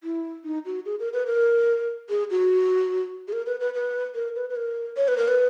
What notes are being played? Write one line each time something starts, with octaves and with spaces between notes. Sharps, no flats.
E4
D#4
F#4
G#4
A#4
B4
A#4
G#4
F#4
G#4
A#4
B4
B4
B4
A#4
B4
B4
A#4
C#5
B4
A#4
B4